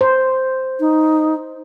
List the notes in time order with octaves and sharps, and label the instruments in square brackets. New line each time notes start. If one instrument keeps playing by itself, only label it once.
[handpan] C5
[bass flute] D#4